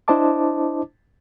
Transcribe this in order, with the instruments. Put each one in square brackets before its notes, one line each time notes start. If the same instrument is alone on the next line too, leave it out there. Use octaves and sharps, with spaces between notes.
[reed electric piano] D4 E4 C5 D#5 A5 D6